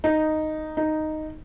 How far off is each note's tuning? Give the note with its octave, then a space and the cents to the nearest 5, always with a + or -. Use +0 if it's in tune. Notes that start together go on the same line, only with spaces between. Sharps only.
D#4 -5
D#4 -5